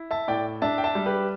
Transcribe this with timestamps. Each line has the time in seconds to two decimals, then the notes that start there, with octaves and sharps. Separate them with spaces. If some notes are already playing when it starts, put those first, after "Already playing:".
Already playing: E4
0.11 E5 A5
0.28 A2 D5 G5
0.62 D4 E5 A5
0.78 G5
0.84 E5 A5
0.95 G3
1.06 G4 B4